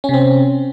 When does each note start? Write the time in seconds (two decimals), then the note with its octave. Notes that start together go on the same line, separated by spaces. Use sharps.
0.04 C#4
0.09 C3
0.14 C4